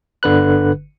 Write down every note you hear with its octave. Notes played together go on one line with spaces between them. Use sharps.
G1 D3 B4 F#6